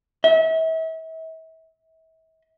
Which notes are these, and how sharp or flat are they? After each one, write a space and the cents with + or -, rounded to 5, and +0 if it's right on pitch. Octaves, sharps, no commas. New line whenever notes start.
E5 -35